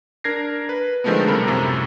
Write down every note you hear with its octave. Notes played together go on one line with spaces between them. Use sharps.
D4 A#4 G#6 A#6 C7
B4
D3 D#3 F3 G#3 A3 B3
B1 C3 G3 A4 A#4 B5
F#2 A2 C3 A4 A#5